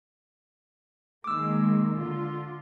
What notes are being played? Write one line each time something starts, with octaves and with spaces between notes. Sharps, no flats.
D#3 G#3 A#3 D6 E6
D3 F4